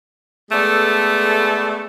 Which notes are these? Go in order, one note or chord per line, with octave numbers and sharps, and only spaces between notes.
G#3 A3 B3 A4 D5